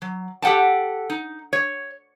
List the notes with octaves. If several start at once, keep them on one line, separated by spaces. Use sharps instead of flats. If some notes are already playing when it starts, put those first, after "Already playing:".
F#3
G4 A4 F#5 G5 A5
D#4
C#5